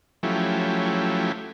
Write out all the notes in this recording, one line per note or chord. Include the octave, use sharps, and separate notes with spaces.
F3 F#3 A3 C#4 E4 G4